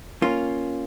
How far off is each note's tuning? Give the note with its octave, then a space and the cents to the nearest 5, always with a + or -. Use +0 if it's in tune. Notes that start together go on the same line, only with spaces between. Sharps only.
A#3 +0 C#4 +0 F4 +0